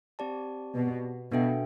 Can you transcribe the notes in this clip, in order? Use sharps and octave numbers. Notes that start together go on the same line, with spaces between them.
C4 G4 D5 A5
B2
B2 B3 D4 A4 E5 G5